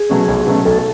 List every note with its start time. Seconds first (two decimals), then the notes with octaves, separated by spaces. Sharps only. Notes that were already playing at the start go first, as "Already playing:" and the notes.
Already playing: G#4
0.10 B2 F#3 A3 C#4
0.28 B1
0.47 B2 F#3 A3 C#4
0.65 B1 A4